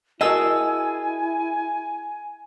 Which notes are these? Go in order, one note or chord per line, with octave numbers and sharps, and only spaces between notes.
E4 F#4 G#4 A#4 D#5 G#5 A5 E6